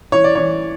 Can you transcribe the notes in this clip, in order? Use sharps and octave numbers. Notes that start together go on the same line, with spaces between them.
E3 C#5
D5
E3 C#5